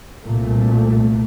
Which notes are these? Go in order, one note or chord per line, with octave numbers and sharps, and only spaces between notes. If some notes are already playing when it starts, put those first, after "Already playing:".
C2 A#2 A3